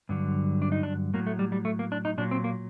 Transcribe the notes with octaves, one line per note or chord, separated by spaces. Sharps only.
G2 D3 F#3
D4
D#4
D4
A2 F#3 A#3
A3
G3
G3
A3
A#3
D4
D#4
A#2 F#3 D4
C4
A#3